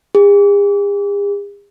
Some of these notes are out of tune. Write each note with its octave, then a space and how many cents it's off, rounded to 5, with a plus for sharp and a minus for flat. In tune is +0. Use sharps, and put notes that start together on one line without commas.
G#4 -45